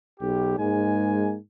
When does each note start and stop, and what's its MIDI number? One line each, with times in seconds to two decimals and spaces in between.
0.21 0.58 35
0.21 0.58 67
0.58 1.35 44
0.58 1.35 56
0.58 1.35 58
0.58 1.35 80